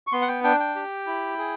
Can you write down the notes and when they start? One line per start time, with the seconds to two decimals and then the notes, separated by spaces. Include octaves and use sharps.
0.07 C#6
0.12 B3 C6
0.22 F#5
0.28 G5
0.44 D4 G5
0.60 G5
0.75 G4
1.07 E4
1.38 G#4